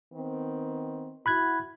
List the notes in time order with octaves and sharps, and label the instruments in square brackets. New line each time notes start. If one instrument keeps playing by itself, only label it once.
[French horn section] D#3 B3 C4
[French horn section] E4 F#4 [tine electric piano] B5 F#6 G#6